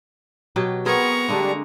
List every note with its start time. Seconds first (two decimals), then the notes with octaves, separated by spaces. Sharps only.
0.56 B2 F#3 G4
0.85 B3 C4 G#4 A#4 B4 A#5 C#6
1.28 D3 G3 G#3 A#3 D4